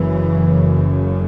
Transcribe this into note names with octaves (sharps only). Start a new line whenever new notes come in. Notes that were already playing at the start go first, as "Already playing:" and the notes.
Already playing: F#1 F#2 C#3 E3